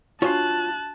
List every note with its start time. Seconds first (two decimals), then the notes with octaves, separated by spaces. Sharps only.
0.22 D4 F4 F#4 C#5 G#5 A5 F#6